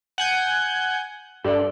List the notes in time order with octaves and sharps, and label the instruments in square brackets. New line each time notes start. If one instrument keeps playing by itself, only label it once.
[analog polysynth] F#5 G#5 G6
[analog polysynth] G2 [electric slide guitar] A4 D5